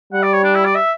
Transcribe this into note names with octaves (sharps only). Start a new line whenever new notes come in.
G3 F#5
D5
C#5
D4
E4
D5
E5